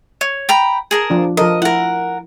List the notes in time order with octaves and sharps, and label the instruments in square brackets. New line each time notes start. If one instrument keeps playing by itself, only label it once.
[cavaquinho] C#5
G5 A#5 B5
G#4 A#4 A5
[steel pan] F3 D4
[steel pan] F3 A4 A#4 [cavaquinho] D#5
[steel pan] E4 [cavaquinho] A#4 F#5